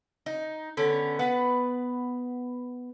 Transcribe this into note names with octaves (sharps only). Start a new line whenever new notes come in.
D#4
D3 B3 C#4
B3 B4 F#5